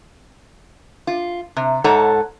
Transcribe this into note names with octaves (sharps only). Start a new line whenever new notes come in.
F4
C3
G#2 A4 C#5 F#5 A#5